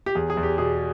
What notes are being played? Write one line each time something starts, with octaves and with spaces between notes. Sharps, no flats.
G4
E2 G#4
G#4
E2
G4
B2 G#4